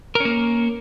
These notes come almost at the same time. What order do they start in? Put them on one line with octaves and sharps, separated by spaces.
A#4 C#4 A#3